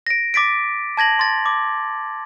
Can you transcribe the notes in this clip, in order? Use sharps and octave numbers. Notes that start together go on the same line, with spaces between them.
A#6 D7
D6 A6 B6 D7
A5 G#6 A#6 F#7
C6 A6
D6